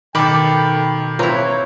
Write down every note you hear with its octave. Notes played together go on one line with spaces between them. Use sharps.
B2 D#3 A4 G5 B5 D6
C4 E4 F4 B4 C#5 A#5